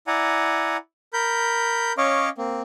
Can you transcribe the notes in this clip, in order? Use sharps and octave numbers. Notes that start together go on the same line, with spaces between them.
E4 D5 F#5 G#5 A#5
A#4 B5 G6
C#4 C#5 D#5 F5 C#6 D6
A#3 C4